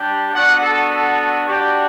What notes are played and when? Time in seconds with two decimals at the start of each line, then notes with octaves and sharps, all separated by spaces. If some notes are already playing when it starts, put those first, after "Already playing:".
Already playing: G3 D4 G4
0.33 B3 D4 F#4 D5 F#5
0.62 A4
0.90 A4
1.47 G3 D4 F#4 G4